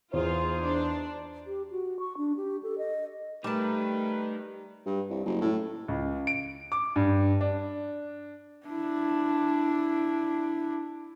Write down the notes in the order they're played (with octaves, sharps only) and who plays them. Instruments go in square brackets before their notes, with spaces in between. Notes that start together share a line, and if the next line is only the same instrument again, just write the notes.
[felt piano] E2 [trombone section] D#4 C5 [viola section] F4 G#4
[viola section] D4
[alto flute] G4
F#4
C#6
D4
G4
A4
D#5
[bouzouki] G3 A5 [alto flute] A3 [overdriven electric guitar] D#4 A#4 [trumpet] B4
[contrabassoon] G2
C2
F#1
A2
[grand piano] C#2
D7
D6
G2
D4
[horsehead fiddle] D4 E4